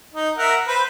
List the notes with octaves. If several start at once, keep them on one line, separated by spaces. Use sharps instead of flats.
D#4
A#4 E5 F#5
B4 C5